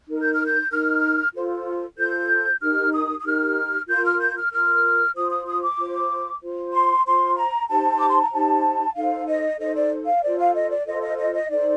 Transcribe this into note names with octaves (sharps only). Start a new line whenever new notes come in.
D#4 A#4
G6
F6
G6
D#4 A#4 F6
F4 A4 C5
F4 A4 C5 G6
D#4 G4 A#4 F6
D#6
D#6
D#4 G4 A#4 F6
F4 A#4 G6
F6
G6
F6
F4 A#4 F6
F4 C5 D#6
D#6
D#6
D6
F4 C5
F4 C5
C6
F4 C5 C6
A#5
D#4 G4 C5 A5
D6
C6
A#5
D#4 G4 C5 A5
D#4 A4 C5 F5
D#5
D#4 A4 C5 D#5
D5
F5
F4 A4 C5 D5
F5
D#5
D5
F4 A4 C5 D#5
D#5
D#5
D#5
D#4 A4 C5 D5